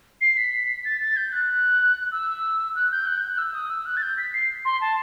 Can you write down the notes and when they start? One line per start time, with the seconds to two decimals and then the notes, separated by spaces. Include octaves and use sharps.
0.21 C7
0.37 B6
0.85 A6
1.01 A6
1.17 G6
1.32 F#6
2.12 E6
2.75 F#6
2.91 G6
3.07 F#6
3.17 G6
3.28 F#6
3.38 E6
3.54 D#6
3.70 E6
3.86 F#6
3.97 A6
4.02 G6
4.18 B6
4.33 C7
4.65 C6
4.81 A5